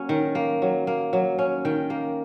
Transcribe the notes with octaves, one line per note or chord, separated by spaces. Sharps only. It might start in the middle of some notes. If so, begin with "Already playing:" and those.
Already playing: F#3 A#3 C#4
D#3
A#3
F#3
A#3
F#3
C#4
D#3 G5
A#3